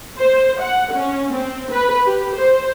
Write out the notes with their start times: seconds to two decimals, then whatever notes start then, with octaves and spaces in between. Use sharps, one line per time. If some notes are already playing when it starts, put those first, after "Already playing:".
0.20 C5
0.62 F#5
0.93 C#4
1.32 C4
1.72 B4
2.07 G4
2.36 C5